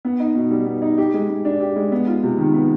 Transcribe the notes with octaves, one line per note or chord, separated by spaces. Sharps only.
B3
D#4
B2
G3
B3
D#4
G4
G#3
G#3
D4
G4
G#3
B3
F4
C3
D#3
B3